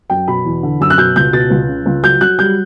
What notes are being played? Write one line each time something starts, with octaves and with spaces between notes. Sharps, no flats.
F#2 G5
B2 B5
E2
D3
F#2 E6
F#6
B2 G6
C#2 G6
B2 A6
C#2
C#3
C#2
F#3 G6
F#3 F#6
G3 G6